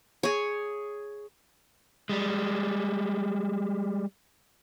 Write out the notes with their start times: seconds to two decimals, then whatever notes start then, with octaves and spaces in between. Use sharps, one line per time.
0.23 G#4 C#5
2.09 G3 G#3